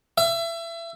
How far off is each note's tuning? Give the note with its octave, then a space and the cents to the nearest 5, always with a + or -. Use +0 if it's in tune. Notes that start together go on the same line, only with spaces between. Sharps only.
E5 +30